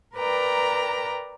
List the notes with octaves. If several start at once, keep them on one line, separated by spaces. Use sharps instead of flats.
A#4 B4 D5 G5 A#5